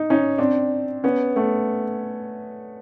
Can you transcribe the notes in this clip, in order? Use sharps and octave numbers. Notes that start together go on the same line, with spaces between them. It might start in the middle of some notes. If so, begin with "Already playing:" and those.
Already playing: D#4
C#4 D#4
C4 D4
B3 C#4
A3 B3